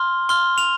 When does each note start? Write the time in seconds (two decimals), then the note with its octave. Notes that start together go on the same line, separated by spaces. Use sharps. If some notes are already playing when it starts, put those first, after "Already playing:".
Already playing: C6 F6 G7
0.29 C6 F6 G7
0.58 F7